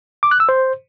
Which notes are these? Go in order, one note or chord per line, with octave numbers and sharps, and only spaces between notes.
D6
F#6
E6
C5